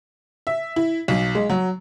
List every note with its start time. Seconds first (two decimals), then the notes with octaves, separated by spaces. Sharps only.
0.47 E5
0.76 E4
1.08 B1
1.35 G#3
1.50 F#3